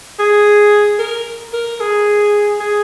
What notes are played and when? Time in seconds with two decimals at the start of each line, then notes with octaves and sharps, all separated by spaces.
0.19 G#4
0.99 A#4
1.53 A#4
1.80 G#4
2.60 G#4